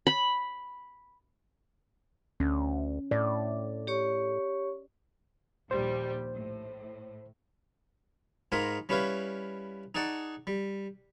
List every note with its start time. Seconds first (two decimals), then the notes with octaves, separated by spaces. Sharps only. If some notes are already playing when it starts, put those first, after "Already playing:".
0.07 B5
2.40 D2 C#4
3.11 A2 D5
3.87 G4 C#5 C#6
5.71 A#1 D#2 G3 C5
6.34 A2
8.52 G#2 G#3 F4 A#4 G#5 B5
8.89 G3 C#4 E4 B4 C#5 F5
9.95 D#4 G#4 D5 F#5 A5 C#6
10.47 G3